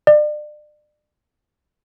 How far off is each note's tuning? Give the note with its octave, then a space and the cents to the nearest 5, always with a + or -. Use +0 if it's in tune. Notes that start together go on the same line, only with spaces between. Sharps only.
D5 +35